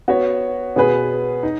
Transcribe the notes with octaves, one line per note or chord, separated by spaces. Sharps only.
B3 F#4 C#5
B2 B3 G#4 B4
D#4